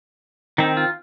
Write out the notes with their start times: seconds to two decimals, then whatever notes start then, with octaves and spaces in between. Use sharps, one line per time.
0.58 D#3 C4 D#4
0.77 F4